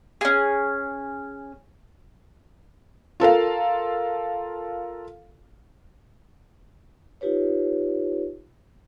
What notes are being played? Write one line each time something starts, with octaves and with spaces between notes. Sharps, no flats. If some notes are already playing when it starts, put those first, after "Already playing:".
C#4 G#4
F4 A4 A#4 F5
D#4 F4 G4 B4 C#5